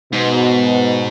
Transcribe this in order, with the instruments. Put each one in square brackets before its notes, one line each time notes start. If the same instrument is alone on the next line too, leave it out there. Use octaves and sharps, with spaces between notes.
[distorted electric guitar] G#2 [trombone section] B2